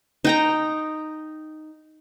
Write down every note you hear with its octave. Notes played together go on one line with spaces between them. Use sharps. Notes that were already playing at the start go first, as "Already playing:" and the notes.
D#4 G5 A#5